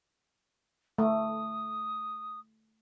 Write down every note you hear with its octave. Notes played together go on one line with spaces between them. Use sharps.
A3 D#6